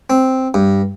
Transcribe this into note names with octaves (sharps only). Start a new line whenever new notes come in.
C4
G2